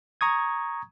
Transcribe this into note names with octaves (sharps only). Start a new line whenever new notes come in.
A#5 C#6 D#6 G#6